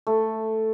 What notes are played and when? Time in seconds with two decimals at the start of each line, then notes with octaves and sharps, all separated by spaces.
0.07 A3